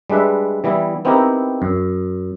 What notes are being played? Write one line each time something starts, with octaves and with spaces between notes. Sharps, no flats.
G3 G#3 D4 B4 E5
E3 G3 B3 E4
B3 C4 D#4 E4 G4 A#4
F#2